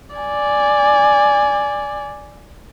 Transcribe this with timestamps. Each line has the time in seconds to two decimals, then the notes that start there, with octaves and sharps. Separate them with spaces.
0.16 D5 G#5